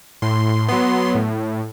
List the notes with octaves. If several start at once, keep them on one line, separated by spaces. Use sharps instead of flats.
A2 C6
F#3 B3 C6
A2